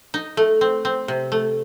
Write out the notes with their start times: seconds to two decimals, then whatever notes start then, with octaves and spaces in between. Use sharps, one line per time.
0.14 D#4
0.37 A3
0.61 C4
0.85 C4
1.08 C3
1.32 A3